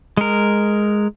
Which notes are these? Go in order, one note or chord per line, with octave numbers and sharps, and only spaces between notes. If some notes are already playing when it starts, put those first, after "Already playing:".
G#3 A#4